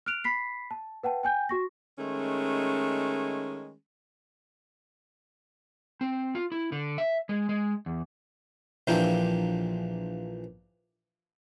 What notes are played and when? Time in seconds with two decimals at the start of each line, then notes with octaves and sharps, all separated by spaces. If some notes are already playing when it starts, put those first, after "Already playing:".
0.06 F6 F#6 D7 F7
0.24 B5 B6 C7
0.71 A5
1.03 B4 F#5 G5 A5
1.23 G5 G#5 G6
1.49 F#4 C#6 A#6
1.98 D#3 G#3 A3 C#4
6.01 C4
6.35 F4
6.52 E4
6.72 D3
6.98 E5
7.29 G#3
7.49 G#3
7.86 E2
8.87 A#1 E3 F3 A#3 D4 G4